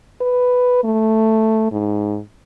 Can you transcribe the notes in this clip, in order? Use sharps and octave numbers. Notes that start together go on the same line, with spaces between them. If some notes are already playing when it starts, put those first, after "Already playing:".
B4
A3
G#2